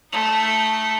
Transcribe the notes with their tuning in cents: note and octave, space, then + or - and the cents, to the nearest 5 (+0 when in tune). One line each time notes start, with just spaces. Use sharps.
A3 +0 D#4 +0